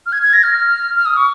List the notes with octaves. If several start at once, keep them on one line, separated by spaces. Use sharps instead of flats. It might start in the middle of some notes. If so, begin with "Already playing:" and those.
F6
G#6
G#6
A#6
F6
F6
D#6
C#6